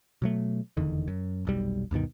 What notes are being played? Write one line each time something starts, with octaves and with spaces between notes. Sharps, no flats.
B2 F#3 A3
F1 E2 D3 D#3
F#2
F1 B1 G3
D2 G2 B2 D#3